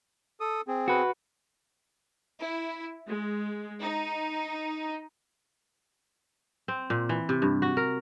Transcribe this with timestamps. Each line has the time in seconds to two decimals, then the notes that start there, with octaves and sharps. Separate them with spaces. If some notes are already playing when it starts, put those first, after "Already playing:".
0.40 A4 D#6
0.68 C4 G#4
0.88 F#4 B4
2.40 E4
3.07 G#3
3.81 D#4
6.68 C4
6.90 A#2
7.09 E3
7.29 C3
7.42 G2
7.62 F#4
7.77 A#4